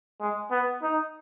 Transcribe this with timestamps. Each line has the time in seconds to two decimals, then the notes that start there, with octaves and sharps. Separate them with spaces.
0.21 G#3
0.51 B3
0.83 D#4